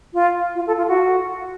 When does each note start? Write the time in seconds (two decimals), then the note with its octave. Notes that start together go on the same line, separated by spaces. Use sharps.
0.14 F4
0.55 F4
0.67 A4
0.77 F4
0.88 F#4